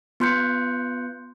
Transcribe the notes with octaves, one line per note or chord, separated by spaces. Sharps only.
B3 F4 C6 F#6 G6 C#7